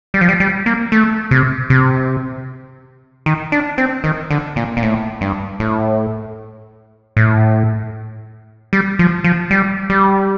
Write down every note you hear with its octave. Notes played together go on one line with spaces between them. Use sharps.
G3
F3
G3
G3
A#3
A3
C3
C3
D#3
D4
C4
D#3
D3
A#2
A#2
A2
G2
A2
A2
G3
F3
F3
G3
G3